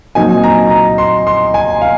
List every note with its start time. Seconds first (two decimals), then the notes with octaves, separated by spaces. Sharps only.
0.15 A#2 F#3 C4 D#4 G#5
0.44 A#5
0.70 A#5
0.98 C6
1.27 C6
1.54 G#5
1.81 F5